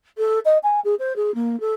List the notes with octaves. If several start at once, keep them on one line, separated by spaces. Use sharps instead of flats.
A4
D#5
G#5
G#4
C5
G#4
A#3
A4